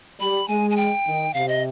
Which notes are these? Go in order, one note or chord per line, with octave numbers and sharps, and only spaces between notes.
G3 B5
G#3 G#5
G#5
G5
D#3
C3 F5
D#5